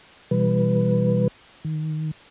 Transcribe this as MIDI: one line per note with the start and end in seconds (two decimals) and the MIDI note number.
0.31 1.28 47
0.31 1.28 52
0.31 1.28 55
0.31 1.28 71
1.65 2.11 51